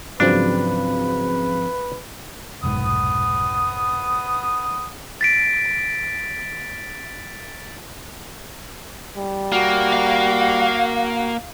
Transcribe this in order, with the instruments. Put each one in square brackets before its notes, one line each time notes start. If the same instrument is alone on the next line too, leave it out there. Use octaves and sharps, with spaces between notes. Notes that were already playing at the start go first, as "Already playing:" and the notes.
[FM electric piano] G#2 F3 C4 [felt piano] C#3 F#3 [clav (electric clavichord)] D4 [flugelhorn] B4
[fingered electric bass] F1 B1 G#2 [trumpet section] B3 D#6
[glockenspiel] A6 B6 D7
[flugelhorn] G3
[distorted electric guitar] A#3 [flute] F#4
[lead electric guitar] F5